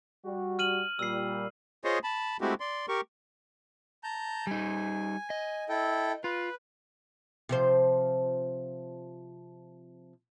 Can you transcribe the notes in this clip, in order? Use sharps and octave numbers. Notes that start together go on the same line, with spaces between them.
G3 F#4
F6 D#7 F#7
A#2 G3 E6 C7
F4 G#4 C5 C#5 D#5
A5 B5
G#3 A3 C4 E4 F#4 G4
D5 C6
G4 A#4 C#6
A5 A#5 G6
G3 D#4 G#5
D#5
E4 A4 G5
F4 B4
C3 F3 C5